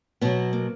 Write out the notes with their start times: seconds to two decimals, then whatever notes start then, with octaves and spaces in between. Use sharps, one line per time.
0.21 B2 F#3 B3
0.53 A#3